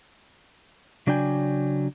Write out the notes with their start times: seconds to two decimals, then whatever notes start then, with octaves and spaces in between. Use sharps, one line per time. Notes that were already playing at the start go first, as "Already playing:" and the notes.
1.07 C#3 F#3 D4 D5 G5 G#5